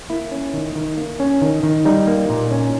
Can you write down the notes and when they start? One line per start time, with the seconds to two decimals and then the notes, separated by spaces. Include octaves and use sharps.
0.10 A#3 E4
0.31 C#4
0.53 D#3
0.75 D#3
0.98 A#3
1.20 C#4
1.42 D#3
1.63 D#3
1.85 G3 D#4
2.07 A#3
2.30 A#2
2.51 C#4